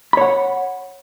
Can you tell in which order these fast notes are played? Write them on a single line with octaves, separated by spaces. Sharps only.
B5 C#5 F#5